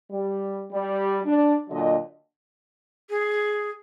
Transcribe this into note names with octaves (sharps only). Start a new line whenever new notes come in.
G3
G3
D4
A#2 D3 F#3 D#5
G#4